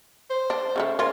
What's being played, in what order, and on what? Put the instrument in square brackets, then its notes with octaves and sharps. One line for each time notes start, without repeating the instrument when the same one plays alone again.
[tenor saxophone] C5
[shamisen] D4
C#3 G#3 A3
[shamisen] C#4 F4 [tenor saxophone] A#4